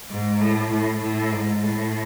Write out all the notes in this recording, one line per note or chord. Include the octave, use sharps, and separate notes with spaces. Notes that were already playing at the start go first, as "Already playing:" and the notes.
G#2
A2
A2
A2
G#2
A2